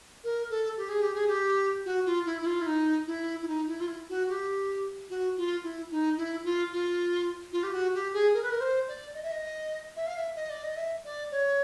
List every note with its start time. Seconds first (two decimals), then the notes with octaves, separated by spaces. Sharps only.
0.24 A#4
0.50 A4
0.77 G4
0.89 G#4
1.02 G4
1.15 G#4
1.27 G4
1.85 F#4
2.06 F4
2.25 E4
2.41 E4
2.46 F4
2.61 E4
2.66 D#4
3.07 E4
3.42 E4
3.47 D#4
3.67 E4
3.80 F4
3.87 E4
4.09 F#4
4.29 G4
5.10 F#4
5.37 F4
5.63 E4
5.91 D#4
6.17 E4
6.44 F4
6.72 F4
7.52 F4
7.63 G4
7.73 F#4
7.94 G4
8.13 G#4
8.34 A#4
8.42 B4
8.50 A#4
8.60 C5
8.88 D5
9.14 D#5
9.23 E5
9.32 D#5
9.96 E5
10.07 F5
10.16 E5
10.36 D#5
10.50 D5
10.64 D#5
10.76 E5
11.05 D5
11.31 C#5